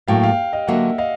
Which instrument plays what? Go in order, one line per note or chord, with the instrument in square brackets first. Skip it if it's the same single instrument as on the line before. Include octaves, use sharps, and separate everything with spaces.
[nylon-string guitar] A2 F#3 A#3 [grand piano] F5 G5
[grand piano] F5 G5
D#5 F5
[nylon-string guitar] D3 F#3 A#3 [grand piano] E5 F#5
[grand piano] D#5 F5